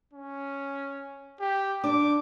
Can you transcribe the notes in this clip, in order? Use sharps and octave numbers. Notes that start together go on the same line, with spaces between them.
C#4
G4
D4 D6